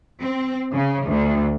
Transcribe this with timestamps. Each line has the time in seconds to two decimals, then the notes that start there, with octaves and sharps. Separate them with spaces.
0.21 C4
0.72 C#3
1.07 D2